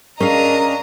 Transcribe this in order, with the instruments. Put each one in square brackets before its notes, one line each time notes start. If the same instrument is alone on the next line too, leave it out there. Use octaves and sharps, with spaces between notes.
[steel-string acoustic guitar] C#4 G#4 F5 [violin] D4 A#5 [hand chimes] A#4 [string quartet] D#5